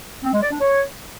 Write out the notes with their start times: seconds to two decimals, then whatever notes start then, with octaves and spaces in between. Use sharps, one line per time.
0.23 C4
0.32 G#3
0.42 D5
0.51 D4
0.61 C#5